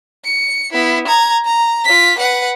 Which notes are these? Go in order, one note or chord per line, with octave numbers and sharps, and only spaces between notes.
C#7
B3 E4
A#5 G#6
A#5
F4 B6
B4 F#5